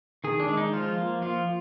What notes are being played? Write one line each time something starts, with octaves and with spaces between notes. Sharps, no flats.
D#3 G#4
D4
G#3
D#4
F3 F4
A#3
F3 F4